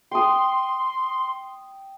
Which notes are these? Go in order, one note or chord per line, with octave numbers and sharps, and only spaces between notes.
G5 C6 D#6